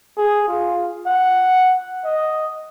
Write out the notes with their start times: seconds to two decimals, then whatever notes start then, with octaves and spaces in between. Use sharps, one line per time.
0.17 G#4
0.48 F4
1.06 F#5
2.05 D#5